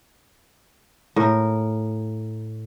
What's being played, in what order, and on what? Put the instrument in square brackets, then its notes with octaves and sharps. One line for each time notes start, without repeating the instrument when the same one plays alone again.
[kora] A2 A#4